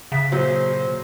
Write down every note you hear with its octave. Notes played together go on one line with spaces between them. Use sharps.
C#3 E5
A#2 F#3 G#4 C5